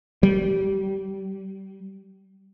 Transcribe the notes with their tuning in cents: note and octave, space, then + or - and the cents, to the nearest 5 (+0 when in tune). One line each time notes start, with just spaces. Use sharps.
G3 -25